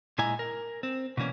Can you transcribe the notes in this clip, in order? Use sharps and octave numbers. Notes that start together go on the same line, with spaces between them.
A#2 G#3 E4 D#5 G#5 A#5
A#4
C4
B2 E3 A#3 C#4 D4